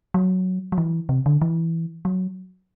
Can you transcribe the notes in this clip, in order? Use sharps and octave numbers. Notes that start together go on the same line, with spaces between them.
F#3
F#3
E3
C3
D3
E3
F#3